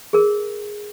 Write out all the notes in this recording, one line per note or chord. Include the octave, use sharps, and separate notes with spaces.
G#4 A#4